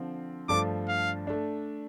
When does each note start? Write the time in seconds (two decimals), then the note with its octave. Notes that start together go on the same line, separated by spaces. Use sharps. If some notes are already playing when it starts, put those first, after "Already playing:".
Already playing: D3 F3 C4
0.49 G2 F3 A3 D4 D6
0.88 F5
1.27 A3 D4